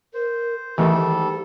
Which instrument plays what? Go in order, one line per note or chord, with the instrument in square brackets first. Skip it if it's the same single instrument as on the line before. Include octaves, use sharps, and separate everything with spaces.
[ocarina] A#4 [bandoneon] C5
[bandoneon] G#2 G3 A4 [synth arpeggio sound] D#3 E3 A3 [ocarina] G4